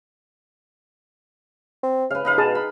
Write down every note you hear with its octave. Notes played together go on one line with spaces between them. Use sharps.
C4
C#3 B4 F5
C#3 D#4 B4 F5
B2 G#4 A5 D#6
B5